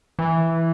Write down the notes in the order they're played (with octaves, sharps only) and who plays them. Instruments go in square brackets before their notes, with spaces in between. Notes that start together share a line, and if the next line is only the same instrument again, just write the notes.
[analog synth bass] E3